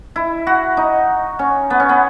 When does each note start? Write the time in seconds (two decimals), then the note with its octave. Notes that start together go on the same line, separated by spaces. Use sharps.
0.16 E4
0.47 F#4
0.77 D#4
1.39 C#4
1.70 B3
1.80 C#4
1.89 B3